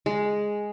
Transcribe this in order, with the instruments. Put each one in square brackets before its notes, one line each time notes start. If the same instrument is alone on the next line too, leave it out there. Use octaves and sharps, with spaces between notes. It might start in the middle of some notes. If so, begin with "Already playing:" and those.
[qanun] G#3